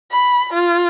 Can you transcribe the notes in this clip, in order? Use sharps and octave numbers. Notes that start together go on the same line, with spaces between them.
B5
F4